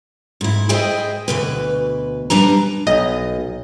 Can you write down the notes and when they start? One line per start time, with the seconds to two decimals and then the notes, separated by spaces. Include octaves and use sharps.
0.41 G#2 E4
0.69 G#4 C5 D#5 E5 G5
1.28 D2 B2 B4
2.30 G3 D4 B4 A#5
2.87 B1 D#5